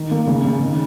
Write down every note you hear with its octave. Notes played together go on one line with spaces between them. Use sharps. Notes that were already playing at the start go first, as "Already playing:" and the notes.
Already playing: D#3
A#3
C#3
C#3
D#3